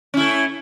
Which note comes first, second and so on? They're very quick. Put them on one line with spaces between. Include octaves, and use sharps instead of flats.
C#4 E4 A3